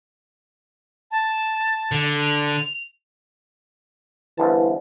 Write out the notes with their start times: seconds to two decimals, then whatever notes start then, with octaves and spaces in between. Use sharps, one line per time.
1.11 A5
1.92 D3
2.21 F7
4.38 G1 C2 E3 A5